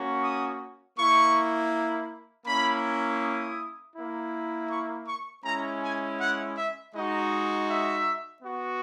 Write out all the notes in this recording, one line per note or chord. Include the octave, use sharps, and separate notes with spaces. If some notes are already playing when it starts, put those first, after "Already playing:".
Already playing: A#3 C#4 F#4
D#6
A#3 E4 C#6
A#3 C#4 E4 B5
D#6
A#3 E4
C#6
C#6
G#3 C#4 E4 A#5
G#5
F#5
E5
G#3 D#4 F#4 D#5
E5
B3 F#4